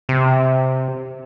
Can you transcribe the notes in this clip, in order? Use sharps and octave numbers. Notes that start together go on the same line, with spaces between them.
C3